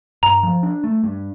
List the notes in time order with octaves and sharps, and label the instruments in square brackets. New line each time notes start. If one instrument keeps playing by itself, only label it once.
[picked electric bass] G2 [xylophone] A#5
[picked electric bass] F3
D4
A3
G2